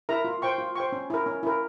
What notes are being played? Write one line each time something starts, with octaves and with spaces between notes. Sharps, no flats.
E4 A#4 E5 A#5
F4
C5 G5 C#6
F4
C5 G5 C#6
C#4
E4 A#4
C#4
E4 A#4